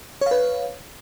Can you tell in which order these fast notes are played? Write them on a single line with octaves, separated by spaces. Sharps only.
C#5 F5 B4